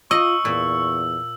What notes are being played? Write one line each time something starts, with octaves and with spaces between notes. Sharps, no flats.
F4 D#5 C#6 E6
E2 A#2